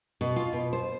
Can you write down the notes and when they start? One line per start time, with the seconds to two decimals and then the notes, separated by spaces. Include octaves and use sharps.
0.21 B2
0.36 F4
0.53 B2
0.73 C5